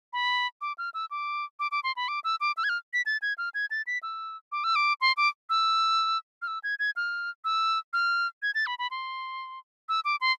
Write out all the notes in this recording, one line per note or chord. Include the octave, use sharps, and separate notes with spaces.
B5
D6
F6
E6
D6
D6
D6
C6
B5
D6
E6
D6
E6
G#6
F6
B6
A6
G#6
F6
G#6
A6
B6
E6
D6
E6
D6
C6
D6
E6
F6
E6
G#6
G#6
F6
E6
F6
G#6
A6
B5
B5
C6
E6
D6
C6